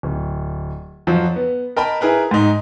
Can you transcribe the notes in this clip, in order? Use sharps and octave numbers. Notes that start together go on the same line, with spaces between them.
D1
F2 F3 F#3
B3
A#4 D#5 G5 A5 B5
E4 G#4 A#4 B4
G#2 D#4